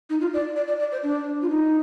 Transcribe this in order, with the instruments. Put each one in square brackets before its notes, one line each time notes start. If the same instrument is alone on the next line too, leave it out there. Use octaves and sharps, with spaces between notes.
[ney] D#4
F4
D5
D5
D5
D5
C5
D4
F4
D#4